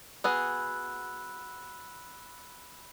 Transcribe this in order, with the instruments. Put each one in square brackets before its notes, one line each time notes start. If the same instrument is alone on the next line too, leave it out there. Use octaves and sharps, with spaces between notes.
[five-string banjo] B3 F#4 G#4 [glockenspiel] B5 E6 F#6